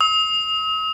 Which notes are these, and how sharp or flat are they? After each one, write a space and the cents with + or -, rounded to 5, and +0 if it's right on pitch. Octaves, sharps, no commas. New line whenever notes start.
D#6 +45